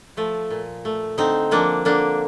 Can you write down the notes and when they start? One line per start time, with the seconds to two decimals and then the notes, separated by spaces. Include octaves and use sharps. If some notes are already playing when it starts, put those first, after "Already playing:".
0.17 F3 A3
0.51 A#2
0.85 A3
1.18 D3 C4 D#4
1.51 F3 A#3 D4
1.85 D3 A#3 D4